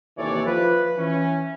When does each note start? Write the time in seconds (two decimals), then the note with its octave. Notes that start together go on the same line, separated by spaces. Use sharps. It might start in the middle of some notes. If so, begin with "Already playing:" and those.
0.18 D#2 C3 E3 A4 C#5 D5
0.46 F3 B4
0.97 E3 C#4